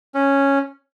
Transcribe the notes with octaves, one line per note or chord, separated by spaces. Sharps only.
C#4